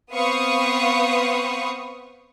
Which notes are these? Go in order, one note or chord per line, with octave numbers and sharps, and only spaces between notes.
B3 C4 B4 F5 C#6 D#6